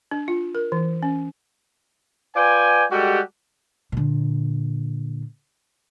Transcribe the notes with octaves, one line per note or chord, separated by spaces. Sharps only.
D4
F4
A#4
E3
C#4
F4 B4 D5 G5 G#5
G3 G#3 F#4 G4 A4 F#5
A#2 D3